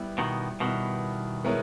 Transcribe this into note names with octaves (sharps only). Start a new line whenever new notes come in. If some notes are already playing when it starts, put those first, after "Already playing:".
Already playing: G3 B3 E4
B2 D#3
B2 D#3 G3 B3 E4
G#3 B3 E4 A#4 C#5